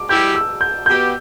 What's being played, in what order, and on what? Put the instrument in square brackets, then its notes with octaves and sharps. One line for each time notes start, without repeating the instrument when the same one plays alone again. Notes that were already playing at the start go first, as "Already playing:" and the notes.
Already playing: [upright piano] D6
[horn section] G3 E4 G4 [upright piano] G6
[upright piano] E6
G6
[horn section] B2 B3 G4 [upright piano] G6